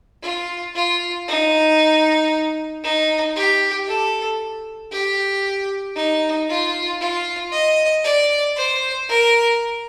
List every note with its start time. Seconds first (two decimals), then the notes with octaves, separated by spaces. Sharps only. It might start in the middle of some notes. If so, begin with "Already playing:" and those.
0.23 F4
0.76 F4
1.28 D#4
2.84 D#4
3.36 G4
3.88 A4
4.92 G4
5.96 D#4
6.49 F4
7.01 F4
7.52 D#5
8.04 D5
8.56 C5
9.09 A#4